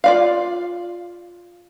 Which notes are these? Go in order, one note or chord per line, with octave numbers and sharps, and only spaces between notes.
F4 D5 F5